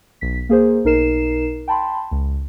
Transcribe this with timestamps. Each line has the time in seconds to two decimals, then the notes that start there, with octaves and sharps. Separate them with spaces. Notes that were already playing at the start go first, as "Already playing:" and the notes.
0.21 B1 B6
0.49 A#3 G#4 C5
0.85 B1 D#4 A#4 C7 E7
1.68 G5 A5 B5 C6
2.11 C#2